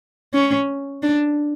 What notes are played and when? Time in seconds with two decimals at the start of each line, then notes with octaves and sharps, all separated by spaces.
0.34 C#4
1.03 D4